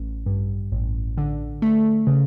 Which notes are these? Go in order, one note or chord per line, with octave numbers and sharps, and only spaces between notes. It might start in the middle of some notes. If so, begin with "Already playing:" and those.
Already playing: A1
G2
A1
D3
A3
C#3